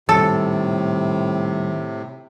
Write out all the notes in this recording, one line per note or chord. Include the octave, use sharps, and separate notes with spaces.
A2 C3 D#3 G3 A4